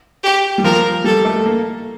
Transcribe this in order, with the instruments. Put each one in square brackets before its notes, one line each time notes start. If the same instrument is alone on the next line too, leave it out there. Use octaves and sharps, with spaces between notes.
[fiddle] G4
[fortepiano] G3
[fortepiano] F3 [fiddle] A#4
[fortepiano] G3 [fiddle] A4
[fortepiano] A3
A#3